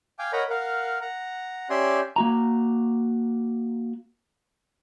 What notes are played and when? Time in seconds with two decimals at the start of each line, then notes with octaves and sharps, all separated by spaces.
0.19 F5 G5 G#5 D6
0.33 A#4 C#5 D#5 F#5 A#5 B5
0.50 A#4 F5 F#5
1.01 F#5 A#5
1.70 C#4 G4 D5 E5 G#5 C6
2.16 A#3 F#4 A#5